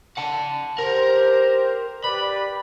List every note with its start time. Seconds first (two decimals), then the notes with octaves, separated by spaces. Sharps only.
0.17 F#5 A5
0.78 G4 A#4 C5
2.04 G4 B4 D5 B5